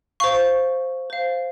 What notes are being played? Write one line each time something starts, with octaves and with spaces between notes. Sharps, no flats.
C5 F5 C#6
C5 F5